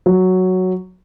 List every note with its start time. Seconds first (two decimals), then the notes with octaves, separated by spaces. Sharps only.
0.06 F#3